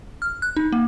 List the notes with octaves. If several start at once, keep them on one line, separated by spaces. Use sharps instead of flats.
F6
F#6
D#4
A#3